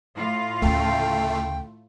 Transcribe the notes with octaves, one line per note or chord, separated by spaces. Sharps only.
A2 F4 F5
D2 C#3 A3 G5